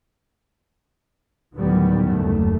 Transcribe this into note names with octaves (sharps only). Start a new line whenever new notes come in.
D2 A2 D#3 F#3 G3 B3
F#1 D#2 A3